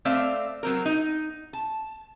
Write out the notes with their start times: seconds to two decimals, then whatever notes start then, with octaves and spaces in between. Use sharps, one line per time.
0.05 A3 C4 D5 E5 F5
0.63 F#3 C4 A#4
0.85 D#4
1.53 A5